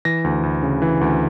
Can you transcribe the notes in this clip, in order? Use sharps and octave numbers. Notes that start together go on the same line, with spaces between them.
E3 A#6
D2
D2
C#3
E3
D2